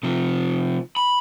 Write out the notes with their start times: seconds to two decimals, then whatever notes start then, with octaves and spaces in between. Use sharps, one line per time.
0.03 C3 F3
0.97 B5